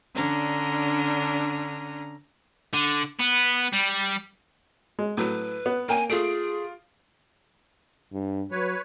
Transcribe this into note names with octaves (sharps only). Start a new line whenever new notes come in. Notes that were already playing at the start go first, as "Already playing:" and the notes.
D3 C#4 D4 A#5
D3
B3
G3
G#3
A2 F#3 B4
B3
A#3 A#4 G5 G#5
A3 F4 G#4 D7
G2
F#3 B4 C#5